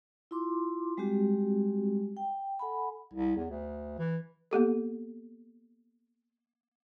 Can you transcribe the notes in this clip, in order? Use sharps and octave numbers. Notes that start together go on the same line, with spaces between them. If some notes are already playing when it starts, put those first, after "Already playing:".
E4 F4 C6 D6
G3 G#3 C4 F#4 G4
G5
A4 F#5 G#5 B5
C2
E2
D2
E3
A#3 B3 G4 A4